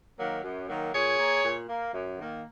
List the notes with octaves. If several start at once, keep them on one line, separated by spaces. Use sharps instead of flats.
D#3 F#3 A#3
F#2
D#3 F#3 A#3
A#2 G#4 C#5
A#3
A#2
A#3
F#2
D#3 A#3